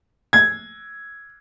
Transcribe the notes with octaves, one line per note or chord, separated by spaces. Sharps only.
G#6